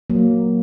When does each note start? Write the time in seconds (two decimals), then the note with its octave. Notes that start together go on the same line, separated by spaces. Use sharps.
0.10 F#3 A#3